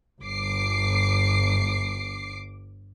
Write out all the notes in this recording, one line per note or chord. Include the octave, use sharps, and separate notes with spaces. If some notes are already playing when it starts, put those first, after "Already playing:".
G1 D6 C7